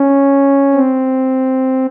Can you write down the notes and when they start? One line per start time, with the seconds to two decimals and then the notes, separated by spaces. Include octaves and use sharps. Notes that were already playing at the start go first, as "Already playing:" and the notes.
Already playing: C#4
0.74 C4